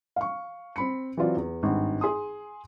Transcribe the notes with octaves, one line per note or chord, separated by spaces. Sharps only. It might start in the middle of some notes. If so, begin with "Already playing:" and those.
F5 C#6
C4 B5 C#7
E3 F#3 C4 F4 D5
E2
G#1 G2
G#4 C6 D#6